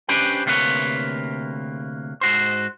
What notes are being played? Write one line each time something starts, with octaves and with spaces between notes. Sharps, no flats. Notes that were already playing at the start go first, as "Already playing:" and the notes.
C#4 D4 G4 B4 C5 G5
D2 C3 A#3 C4 B4 C#5
G#2 F#4 C5